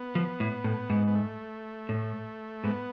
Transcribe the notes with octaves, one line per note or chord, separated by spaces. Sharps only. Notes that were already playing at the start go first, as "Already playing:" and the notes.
Already playing: B3
F3
A2
A2
G#2
B3
A3
A2
G#2 B3